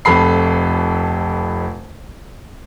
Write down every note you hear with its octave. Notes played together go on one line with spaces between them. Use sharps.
F1 F2 A4 B5 C7